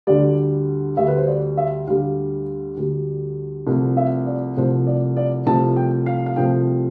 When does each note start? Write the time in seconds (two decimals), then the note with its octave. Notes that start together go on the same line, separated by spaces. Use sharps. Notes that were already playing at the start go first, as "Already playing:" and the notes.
0.07 D2 D3 G3 D5
0.97 D2 D3 G3 E5
1.08 B4
1.17 C5
1.27 D5
1.57 E5
1.87 D2 D3 G3 F5
2.77 D2 D3 G3
3.67 C2 C3 F3 A3
3.97 E5
4.26 D5
4.56 C2 C3 F3 A3 C5
4.87 D5
5.17 D5
5.46 C2 C3 F3 A3 A5
5.76 G5
6.06 F5
6.26 F5
6.36 C2 C3 F3 A3 G5